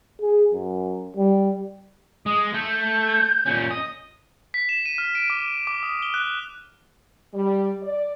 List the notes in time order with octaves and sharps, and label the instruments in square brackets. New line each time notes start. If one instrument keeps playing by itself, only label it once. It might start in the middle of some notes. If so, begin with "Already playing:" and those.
[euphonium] G#4
F#2
G3
[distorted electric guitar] G#3 [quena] D#6
[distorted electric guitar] A3 [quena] G6
[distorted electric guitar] A#2 C#4
D#5
[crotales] B6
E7
D#7
F6
D7
D6
D6
D#6
G7
F#6
[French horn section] G3
D5